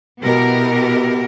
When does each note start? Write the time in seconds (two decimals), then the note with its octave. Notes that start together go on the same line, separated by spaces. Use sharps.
0.21 B2 B3 E4 G4 A#4